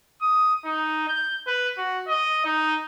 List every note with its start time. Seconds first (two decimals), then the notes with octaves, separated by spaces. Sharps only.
0.22 D#6
0.65 D#4
1.08 G6
1.47 B4
1.77 F#4
2.08 D#5
2.45 D#4